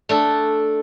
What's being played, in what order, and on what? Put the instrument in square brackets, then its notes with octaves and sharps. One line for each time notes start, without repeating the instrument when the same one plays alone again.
[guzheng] A3 D4 A4